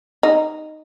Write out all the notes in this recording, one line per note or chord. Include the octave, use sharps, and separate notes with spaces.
D#4